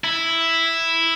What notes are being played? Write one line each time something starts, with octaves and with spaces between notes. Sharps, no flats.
E4